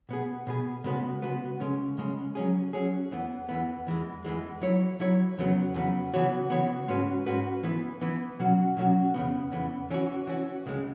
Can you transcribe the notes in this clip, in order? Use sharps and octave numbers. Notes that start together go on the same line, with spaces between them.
B2 B3 G#4
B2 B3 G#4
C#3 G#3 B3 F#4 B4
C#3 G#3 B3 F#4 B4
C#3 G#3 C#4
C#3 G#3 C#4
F#3 C#4 G#4
F#3 C#4 G#4
E2 E3 B3
E2 E3 B3
E2 E3 G#3
E2 E3 G#3
F#3 E4 C#5
F#3 E4 C#5
E2 C#3 F#3 B3
E2 C#3 F#3 B3
C#3 E3 B3 F#4 C#5
C#3 E3 B3 F#4 C#5
G#2 G#3 C#4 F#4 B4
G#2 G#3 C#4 F#4 B4
E3 B3 E4 B4
E3 B3 E4 B4
B2 F#3 C#4 F#4
B2 F#3 C#4 F#4
E2 C#3 E3 B3
E2 C#3 E3 B3
E3 C#4 F#4
E3 C#4 F#4
C#2 C#3 G#3